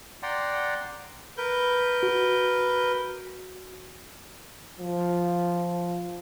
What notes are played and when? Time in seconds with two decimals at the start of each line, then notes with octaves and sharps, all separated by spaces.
0.23 D5 F#5 G5 A#5 C6
1.38 A#4 B4 G6
2.03 F#4
4.80 F3